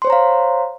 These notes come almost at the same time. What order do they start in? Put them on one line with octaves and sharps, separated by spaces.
C6 C5 C#5 A#5 F5